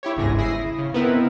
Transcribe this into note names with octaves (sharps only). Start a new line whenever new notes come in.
E4 G4 C#5
G1 C#2 G#2 G#4 A#6
E4 D#6 A#6 C7
C#3
B3 C4 D#4 E4 A#4 B4